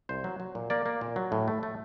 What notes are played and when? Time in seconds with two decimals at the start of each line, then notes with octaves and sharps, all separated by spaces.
0.09 C2 C5
0.24 F#3
0.40 F#3
0.55 A#2
0.70 A#3 D5
0.86 A#3
1.01 A#2
1.16 F#3
1.32 A2
1.48 A3
1.63 A3